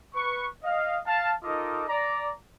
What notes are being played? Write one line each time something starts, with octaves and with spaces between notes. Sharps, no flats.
B4 C#6
D#5 F5
F5 A5
D#4 F4 A4 A#4 D#5 D6
D5 A#5